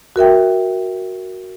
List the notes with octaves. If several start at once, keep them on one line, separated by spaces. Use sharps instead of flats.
F#4 A#4 E5 G5